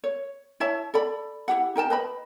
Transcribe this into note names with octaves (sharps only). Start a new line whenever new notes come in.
C#5
E4 C#5 E5 A5
A4 D5 B5
E4 G4 F#5
D#4 A#4 G5 A5
B4 D#5 B5